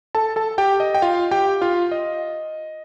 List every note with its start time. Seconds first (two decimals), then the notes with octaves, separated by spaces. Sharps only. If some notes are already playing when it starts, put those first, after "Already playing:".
0.15 A4 A5
0.36 A4 A5
0.58 G4 G5
0.80 D#5
0.95 G5
1.02 F4 F5
1.31 G4 G5
1.61 F4 F5
1.92 D#5